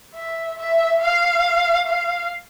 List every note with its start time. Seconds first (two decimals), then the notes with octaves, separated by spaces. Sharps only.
0.15 E5
0.58 E5
1.01 F5
1.87 F5